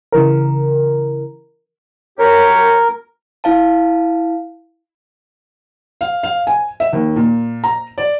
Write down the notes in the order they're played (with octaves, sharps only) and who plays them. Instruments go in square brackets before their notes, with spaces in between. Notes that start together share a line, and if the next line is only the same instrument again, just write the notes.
[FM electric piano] C#3 E3 A#4
[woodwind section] F#2 G4 C#5 [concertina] A#4
[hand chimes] E4 F5 A5
[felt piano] F5
F5
G#5
E5
D#2
A#2
A#5
D5